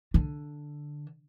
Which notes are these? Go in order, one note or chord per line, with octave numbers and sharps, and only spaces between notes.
D3